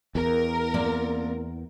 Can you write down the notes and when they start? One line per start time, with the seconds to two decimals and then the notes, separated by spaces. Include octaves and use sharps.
0.15 E2 A#4
0.74 A#3 C4 D5